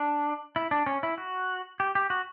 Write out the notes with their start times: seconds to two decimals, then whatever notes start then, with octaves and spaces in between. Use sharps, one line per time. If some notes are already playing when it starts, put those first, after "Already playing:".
Already playing: D4
0.56 E4
0.71 D4
0.86 C#4
1.03 E4
1.18 F#4
1.80 G4
1.95 G4
2.10 F#4